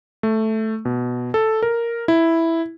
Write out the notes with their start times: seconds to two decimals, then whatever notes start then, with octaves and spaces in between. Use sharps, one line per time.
0.23 A3
0.85 B2
1.34 A4
1.63 A#4
2.08 E4